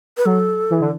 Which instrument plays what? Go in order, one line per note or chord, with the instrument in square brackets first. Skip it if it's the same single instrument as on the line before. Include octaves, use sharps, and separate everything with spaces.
[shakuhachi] B4
[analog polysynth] F#3 [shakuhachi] A4
[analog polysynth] E3
D3